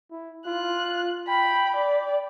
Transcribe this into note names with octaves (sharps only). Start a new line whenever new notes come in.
E4
F4 F#6
G5 B5
D5